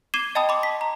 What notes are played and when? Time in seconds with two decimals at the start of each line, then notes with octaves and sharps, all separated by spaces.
0.14 D6 G#6 C7 D#7 E7 G7
0.35 D#5 G5 A5 B5 D#6
0.49 B5 C6 D6
0.63 B6
0.81 A#5